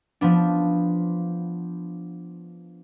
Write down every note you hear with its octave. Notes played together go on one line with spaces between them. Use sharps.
F3 B3 D4